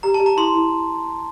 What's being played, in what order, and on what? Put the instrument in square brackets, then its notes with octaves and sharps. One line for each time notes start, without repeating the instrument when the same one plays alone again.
[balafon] G4 [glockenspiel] A#5
[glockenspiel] A5
[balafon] G4
[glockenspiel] A#5
[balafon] E4 [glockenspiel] C6
[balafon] E4